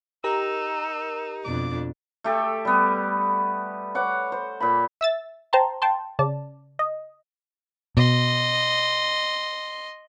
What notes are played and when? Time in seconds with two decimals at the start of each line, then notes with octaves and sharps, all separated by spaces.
0.24 D#4 G4 A#4 A#5 E6
1.44 F2 B2 D4 D6
2.24 A3 G4 A4
2.65 G3 B3
3.95 C#5 F#5 D6
4.32 C5
4.60 A#2 B5
5.01 E5 E6 A6
5.53 C5 G5 A5 A#5 C6
5.82 G5 A5 C6
6.19 C#3 D5 A5
6.79 D#5
7.97 B2 D#5 C6